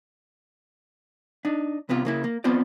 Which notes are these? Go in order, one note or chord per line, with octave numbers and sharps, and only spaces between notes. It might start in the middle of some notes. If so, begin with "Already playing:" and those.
D4 D#4
C2 C3 B3 F4
C#3 A#3 E4
A#3
B3 C4 F4 C5 D5